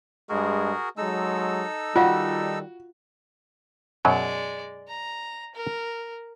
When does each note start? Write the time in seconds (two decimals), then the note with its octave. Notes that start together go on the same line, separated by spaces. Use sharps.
0.29 G2 G#3 F#4 G#4 A#4
0.98 F#3 G#3 D#4 A4 E6
1.96 D#3 G3 F4 F#4 F5
4.05 F#2 B2 F#3 G#3 D5
4.88 A#5
5.55 A#4